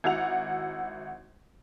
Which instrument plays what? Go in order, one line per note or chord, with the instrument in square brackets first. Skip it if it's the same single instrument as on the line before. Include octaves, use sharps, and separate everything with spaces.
[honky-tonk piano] G#1 E4 F#4 F#5 F7